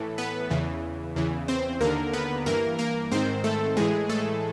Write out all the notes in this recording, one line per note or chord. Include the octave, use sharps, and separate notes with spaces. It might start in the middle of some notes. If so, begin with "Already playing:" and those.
Already playing: A2 E3 A4
B3 B4
E2 C#3 E3
E2 C#3 E3
C4 C5
D#2 D3 A#3 A#4
B3 B4
G2 E3 A#3 A#4
A#3 A#4
G#2 D#3 C4 C5
A3 A4
A2 E3 G#3 G#4
A3 A4